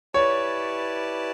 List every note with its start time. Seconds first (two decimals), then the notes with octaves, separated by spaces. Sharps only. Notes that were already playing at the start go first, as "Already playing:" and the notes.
0.14 E4 G4 B4 C#5 D5 A5